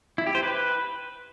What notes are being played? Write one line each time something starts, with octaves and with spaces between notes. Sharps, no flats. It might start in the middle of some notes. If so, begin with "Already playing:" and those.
E4
G4
C5
B4